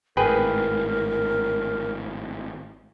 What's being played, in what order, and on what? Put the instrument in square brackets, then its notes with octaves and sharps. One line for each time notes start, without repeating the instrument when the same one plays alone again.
[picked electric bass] G#1 A2 [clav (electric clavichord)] G#4 B4 G5 [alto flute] A#4